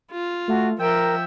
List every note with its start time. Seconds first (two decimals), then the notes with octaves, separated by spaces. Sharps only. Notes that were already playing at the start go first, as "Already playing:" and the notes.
0.11 F4
0.48 A3 F#4
0.79 F3 A#4 E5 G5